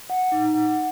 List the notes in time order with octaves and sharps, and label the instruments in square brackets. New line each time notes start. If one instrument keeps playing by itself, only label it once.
[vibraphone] F#5
D#4
F#5